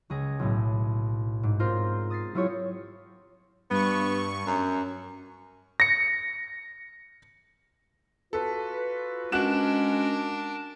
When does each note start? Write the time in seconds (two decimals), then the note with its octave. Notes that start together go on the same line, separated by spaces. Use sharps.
0.10 C#2 G#4 A#6
0.39 B1 A2
1.43 G#2
1.59 C4 F4 A#4 C5
2.10 D#6 A6 A#6 C7
2.34 F#3 E4 F4 G4 C#5
3.70 G2 B3 C#6
4.47 F#2
5.80 A#6 C#7
8.33 F4 F#4 A4 B4
9.32 G#3 C#4 D4 F#4 A#4 F#6 E7